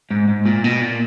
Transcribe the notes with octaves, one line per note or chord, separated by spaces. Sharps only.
G#2
G#2
A#2
B2
A#2